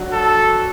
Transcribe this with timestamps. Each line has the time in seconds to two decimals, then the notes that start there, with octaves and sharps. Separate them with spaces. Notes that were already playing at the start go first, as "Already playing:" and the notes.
Already playing: F#3 D4 F#4
0.13 A4